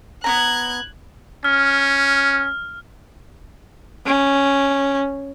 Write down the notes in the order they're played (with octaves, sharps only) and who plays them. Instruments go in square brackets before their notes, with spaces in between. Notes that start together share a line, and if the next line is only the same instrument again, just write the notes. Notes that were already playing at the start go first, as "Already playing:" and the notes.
[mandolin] B3 C#4 A#5 [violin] F#6 G#6
[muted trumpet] C#4 [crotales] F6
[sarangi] C#4